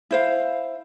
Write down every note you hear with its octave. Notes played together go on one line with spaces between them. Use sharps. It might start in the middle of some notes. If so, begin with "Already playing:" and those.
E4 C5 F5